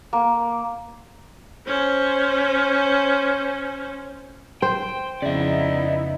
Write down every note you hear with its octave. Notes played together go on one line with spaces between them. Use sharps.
A#3
C#4 C5
C5 G5
F2 C#3 B3 D#4 E4 D5 E5